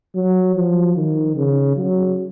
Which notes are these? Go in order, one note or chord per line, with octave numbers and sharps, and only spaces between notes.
F#3
F3
D#3
C#3
F#3